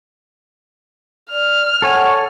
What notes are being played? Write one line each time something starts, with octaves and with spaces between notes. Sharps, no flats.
D5 F6
A4 C#5 F#5 G#5